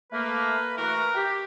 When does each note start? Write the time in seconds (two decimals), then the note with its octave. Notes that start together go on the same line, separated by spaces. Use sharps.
0.12 A3 A#3 B4
0.77 E3 A3 F#4 A#4
1.14 G4